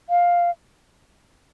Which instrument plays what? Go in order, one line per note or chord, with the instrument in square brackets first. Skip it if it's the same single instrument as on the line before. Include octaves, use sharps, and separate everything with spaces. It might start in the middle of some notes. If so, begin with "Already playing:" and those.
[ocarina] F5